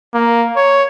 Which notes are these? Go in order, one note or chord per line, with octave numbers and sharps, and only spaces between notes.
A#3
C#5